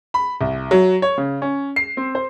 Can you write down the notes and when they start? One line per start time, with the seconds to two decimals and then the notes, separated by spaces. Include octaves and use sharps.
0.14 B5
0.41 C2
0.71 F#3
1.02 C#5
1.18 C#3
1.42 C#4
1.76 C7
1.97 C4
2.15 C5